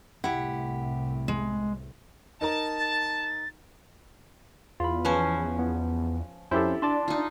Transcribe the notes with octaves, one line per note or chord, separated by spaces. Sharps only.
C2 A2 C3 E4 G4 F#5
G#3
D#4 A#4 A5 A#5
A6
E2 F4 B5
F3 C#4 B4 C5
B3
F2 C#4 E4 G4 A4 C5
D4 D5 A5 C6
D#4 F4